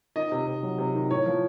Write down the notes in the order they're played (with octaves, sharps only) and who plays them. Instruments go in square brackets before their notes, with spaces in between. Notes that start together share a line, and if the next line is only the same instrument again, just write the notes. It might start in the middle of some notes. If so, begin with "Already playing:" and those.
[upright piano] D#3 D#5
C3
C3
F#3
C3
D#3
A2 C#5
F3